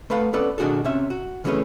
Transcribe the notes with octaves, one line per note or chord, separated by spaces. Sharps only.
A3 B4 F5 F#5
B3 C#4 A4 B4 D5 B5
B2 D#3 D4 F#4 G#4 A4
C3 C#4 E5
F#4
C#3 E3 A3 C#4 G#4 B4